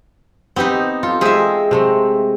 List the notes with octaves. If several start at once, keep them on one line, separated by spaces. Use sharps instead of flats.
B3 C4 D#4 G4 B4
F4 A4
G#3 C4 G4 G#4 E5
C3 A3 C4